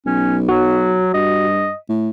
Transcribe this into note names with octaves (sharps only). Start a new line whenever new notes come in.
B1 C#4
F#3 F#4
G2 D#5
A2